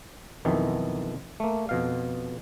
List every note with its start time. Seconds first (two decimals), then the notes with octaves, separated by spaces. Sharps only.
0.45 B1 F2 D#3 E3
1.40 A3 A#3
1.69 F2 B2 F5